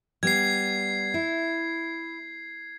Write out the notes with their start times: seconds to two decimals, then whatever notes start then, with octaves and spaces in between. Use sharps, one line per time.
0.23 G3 B3 G#6 C7
1.14 E4